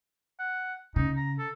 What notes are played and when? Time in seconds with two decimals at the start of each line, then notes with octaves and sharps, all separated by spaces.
0.40 F#5
0.96 C#3 D#4
1.16 A#5
1.39 A4